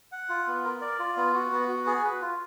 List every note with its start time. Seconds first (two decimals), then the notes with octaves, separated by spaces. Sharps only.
0.12 F#5
0.29 F4
0.47 B3
0.64 A#4
0.81 D5
0.99 F4
1.17 B3
1.34 F#4
1.52 B3
1.69 F#4
1.86 G#4
2.04 B4
2.21 F4